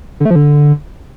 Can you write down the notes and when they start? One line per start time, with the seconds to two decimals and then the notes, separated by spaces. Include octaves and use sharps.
0.20 D3
0.25 A3
0.30 F3
0.35 D3